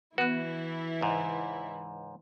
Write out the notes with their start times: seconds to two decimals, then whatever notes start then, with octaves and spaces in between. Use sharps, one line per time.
0.18 E3 B3 E4 F#4 B4
1.01 C#2 G#2